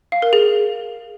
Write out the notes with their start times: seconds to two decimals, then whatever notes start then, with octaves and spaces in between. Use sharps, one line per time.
0.12 F5
0.22 A#4
0.33 G#4